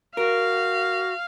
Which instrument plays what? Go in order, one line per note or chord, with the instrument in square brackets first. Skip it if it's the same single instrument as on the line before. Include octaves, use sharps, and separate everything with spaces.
[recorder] F#4 [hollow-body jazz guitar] A#4 [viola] F5